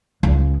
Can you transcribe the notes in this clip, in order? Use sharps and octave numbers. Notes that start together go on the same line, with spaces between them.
C#2